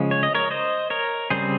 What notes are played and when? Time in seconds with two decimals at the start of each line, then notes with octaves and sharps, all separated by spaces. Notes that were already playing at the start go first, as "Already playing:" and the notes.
Already playing: C#3 F3 G#3 C#4
0.11 C#5
0.23 D#5
0.35 A#4 C#5
0.51 C5 D#5
0.90 A#4 C#5
1.30 C#3 G3 C4 G#4 C5